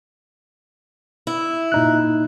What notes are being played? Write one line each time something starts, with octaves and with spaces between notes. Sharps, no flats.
E4
A#2 D#4 F#6